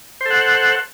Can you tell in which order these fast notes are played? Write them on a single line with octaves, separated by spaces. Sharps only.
C5 A4 F#5